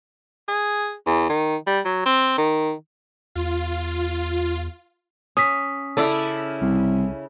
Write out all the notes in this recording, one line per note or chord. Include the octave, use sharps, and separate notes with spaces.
G#4
E2
D#3
G3
F#3
C4
D#3
E2 F4
C#4 D#6 B6
C#3 E4 A4 D5
C2